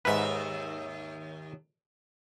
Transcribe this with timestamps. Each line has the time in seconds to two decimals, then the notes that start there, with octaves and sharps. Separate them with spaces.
0.05 D#2 G#2 D#4 B4 E5